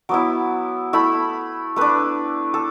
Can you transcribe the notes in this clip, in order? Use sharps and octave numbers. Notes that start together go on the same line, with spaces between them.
F#3 B3 E4 D6
A3 E4 B5
A3 D4 B4
A4